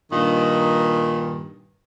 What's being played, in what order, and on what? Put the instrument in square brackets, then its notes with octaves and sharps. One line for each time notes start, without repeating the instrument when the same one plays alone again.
[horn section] G2 A#2 D#3